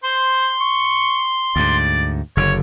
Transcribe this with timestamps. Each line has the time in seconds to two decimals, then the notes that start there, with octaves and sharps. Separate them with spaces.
0.03 C5 C6
0.61 C#6
1.56 D2 G#2 D5
2.37 F#1 D3 C#5